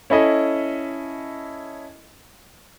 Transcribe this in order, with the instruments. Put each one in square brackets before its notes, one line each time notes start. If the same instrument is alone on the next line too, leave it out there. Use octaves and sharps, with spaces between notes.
[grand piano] C#4 E4 A4 D#5 B5